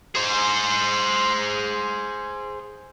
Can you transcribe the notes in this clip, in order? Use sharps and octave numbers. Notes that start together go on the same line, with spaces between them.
G#4 C5